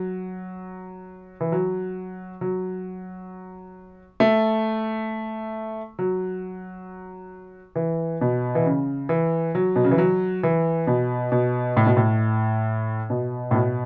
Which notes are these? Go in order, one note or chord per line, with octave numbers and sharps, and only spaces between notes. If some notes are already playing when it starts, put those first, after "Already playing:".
Already playing: F#3
E3
F#3
F#3
A3
F#3
E3
B2
E3
C#3
E3
F#3
B2
C#3
E3
F#3
E3
B2
B2
A2
B2
A2
B2
A2
B2